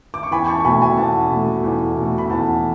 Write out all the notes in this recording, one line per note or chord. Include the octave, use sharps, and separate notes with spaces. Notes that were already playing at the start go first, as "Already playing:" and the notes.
D6
C#6
E2 G#5 B5
A5 C#6
C#6
B2 A3 G#5 B5
G#5 B5
E2 F#5 A5
B2 A3
E2
B2
A3
B5
E2 F#5 A5